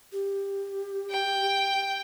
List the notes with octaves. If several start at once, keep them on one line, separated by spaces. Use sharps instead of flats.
G4
G5